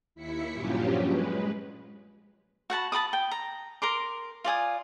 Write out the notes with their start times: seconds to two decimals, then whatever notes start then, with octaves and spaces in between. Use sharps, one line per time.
0.15 D#2 E4 B6 C#7
0.53 G2 A#2 F3 F#3 C#4 G4
1.05 G#3 B4
2.70 F#4 F#5 A5 B5
2.92 A5 B5 D6 D#6
3.13 G5
3.31 A#5
3.82 A#4 C6 D6
4.44 F4 D5 G#5 D#6